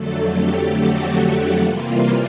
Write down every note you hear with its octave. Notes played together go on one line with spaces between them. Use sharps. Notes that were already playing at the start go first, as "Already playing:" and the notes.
Already playing: F2 D3 F#3 A3 A4
G4
F#4
F#4
C3 E3 G3 A#3 F4